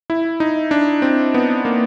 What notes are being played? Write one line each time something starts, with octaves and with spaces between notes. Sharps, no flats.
E4
D#4
D4
C4
B3
A#3